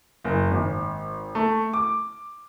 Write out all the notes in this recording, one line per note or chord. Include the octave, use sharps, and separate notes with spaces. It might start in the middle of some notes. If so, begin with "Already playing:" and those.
F#1
G#1
A3
D6